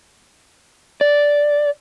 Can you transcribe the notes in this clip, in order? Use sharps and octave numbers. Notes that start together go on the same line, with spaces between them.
D5